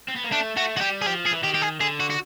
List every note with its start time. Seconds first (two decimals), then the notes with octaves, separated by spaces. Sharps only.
0.08 C4
0.16 B3
0.24 A#3
0.31 A3 D4
0.56 A3 F#4
0.77 G#3 F#4
0.81 G3 G4
1.01 G#4
1.06 F3 G4
1.25 G#4
1.33 E3
1.43 D#3 G4
1.54 G4
1.62 G#4
1.80 D3 G#4
2.00 F#4
2.10 F#4